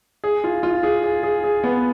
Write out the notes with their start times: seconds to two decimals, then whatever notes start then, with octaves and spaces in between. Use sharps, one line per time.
0.24 G#4
0.44 F4
0.63 F4
0.83 G#4
1.03 G#4
1.23 G#4
1.44 G#4
1.64 B3